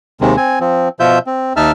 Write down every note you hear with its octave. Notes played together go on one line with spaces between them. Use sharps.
D#2 C3 D#3 G#3
C4 G#5
F3 C4
B2 F3 F4 E5 G6
C4
D#2 D#4 E5 A5 F6